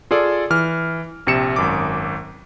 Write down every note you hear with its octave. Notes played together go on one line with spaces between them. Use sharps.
F4 G#4 A4 D5
E3 F6
A#1 C3 C#7 E7
G#1 F#2 D6